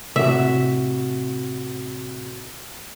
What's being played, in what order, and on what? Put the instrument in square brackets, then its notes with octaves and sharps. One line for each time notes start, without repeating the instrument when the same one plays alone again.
[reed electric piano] A2 F#4 [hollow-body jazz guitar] C3 [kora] E5